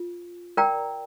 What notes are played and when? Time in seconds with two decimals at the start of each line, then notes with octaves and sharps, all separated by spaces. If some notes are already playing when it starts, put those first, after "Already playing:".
Already playing: F4
0.57 A#4 D5 G5 A#5